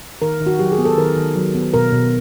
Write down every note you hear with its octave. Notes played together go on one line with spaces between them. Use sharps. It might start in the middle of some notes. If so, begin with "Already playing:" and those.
D#3 A#4
D#3
F#4
F#3 G4
G#4
B3
A4
D#3 A#4
D#3
F#3
B3
B2 A#4
B2